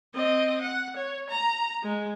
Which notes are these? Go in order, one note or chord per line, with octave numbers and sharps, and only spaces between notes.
C4 D#5
F#5
C#5
A#5
G#3